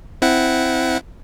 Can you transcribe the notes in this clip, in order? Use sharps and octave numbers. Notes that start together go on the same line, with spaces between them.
C4 E4 F#5